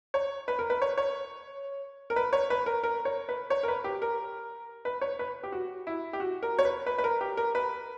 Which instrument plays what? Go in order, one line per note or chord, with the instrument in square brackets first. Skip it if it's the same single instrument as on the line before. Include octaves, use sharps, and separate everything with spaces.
[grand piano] C#5
B4
A#4
B4
C#5
C#5
A#4
B4
C#5
B4
A#4
A#4
C#5
B4
C#5
A#4
B4
G4
A#4
B4
C#5
B4
G4
F#4
E4
G4
F#4
A#4
C#5
B4
B4
B4
A#4
G4
A#4
B4